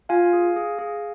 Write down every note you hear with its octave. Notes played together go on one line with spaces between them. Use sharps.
F4 F5 G#5
G#4
G#4
G#4